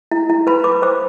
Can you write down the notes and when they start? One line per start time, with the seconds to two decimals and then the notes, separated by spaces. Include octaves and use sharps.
0.11 E4
0.29 E4
0.47 B4 B5
0.64 B4 D6
0.82 C5 D6